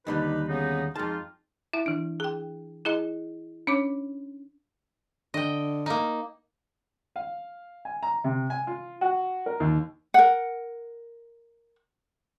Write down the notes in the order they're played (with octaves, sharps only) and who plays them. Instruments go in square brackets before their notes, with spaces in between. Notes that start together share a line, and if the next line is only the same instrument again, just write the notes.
[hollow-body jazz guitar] D#2 D3 G3 [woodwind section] D#4 B4
[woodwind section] C#3 B3 D#4
[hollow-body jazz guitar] F2 A5 [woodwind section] G#3 D#4 F4
[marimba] E4 E5
E3 D4
G#4 G5
E4 G#4 D#5
C#4 D4 C#5 D6
[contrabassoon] D3 [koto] D#5 G5
[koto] A#3 D#4
[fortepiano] F5
G#5
A#5
C3
G#5
F4
F#4
A#4
D#2
[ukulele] A#4 F#5